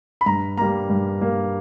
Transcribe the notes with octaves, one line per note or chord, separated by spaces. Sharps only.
B5
G2 A#5
G3 A#3 A#5
G2
G3 A#3